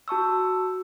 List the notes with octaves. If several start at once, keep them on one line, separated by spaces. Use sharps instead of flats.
F#4 A5 C#6 E6